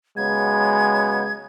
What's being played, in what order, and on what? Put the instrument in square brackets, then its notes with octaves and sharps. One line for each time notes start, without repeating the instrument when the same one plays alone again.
[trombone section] C#3 F#3 B3 [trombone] G#3 [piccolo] G#6